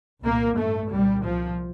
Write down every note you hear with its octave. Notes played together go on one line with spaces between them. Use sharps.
C2 A#2 A#3
A1 G2 A3
C2 A#2 G3
C2 A#2 F3